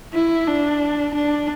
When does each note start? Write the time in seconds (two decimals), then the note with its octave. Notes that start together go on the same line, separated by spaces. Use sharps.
0.13 E4
0.47 D4
1.14 D4